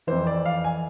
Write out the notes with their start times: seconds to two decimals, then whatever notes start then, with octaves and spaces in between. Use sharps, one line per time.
0.07 F2 E3 C5
0.27 D5
0.45 F5
0.64 G#5